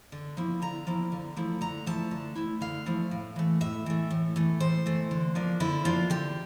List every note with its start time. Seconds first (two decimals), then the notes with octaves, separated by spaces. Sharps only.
0.12 D3
0.37 F3 A#3 E4
0.62 D3 A#5
0.87 F3 A#3 E4
1.12 D3
1.37 F3 A3 E4
1.61 D3 A#5
1.86 F3 A3 E4 A5
2.11 D3
2.35 F3 A3 E4
2.61 D3 F5
2.86 F3 A3 E4
3.11 A2
3.36 E3 A3
3.61 A2 E5
3.86 E3 A3
4.11 A2
4.36 E3 A3
4.60 A2 C5
4.86 E3 A3
5.11 D3
5.35 F3 A#3 D4
5.60 D3 E4
5.85 F3 A#3 D4 F4
6.10 D3 G4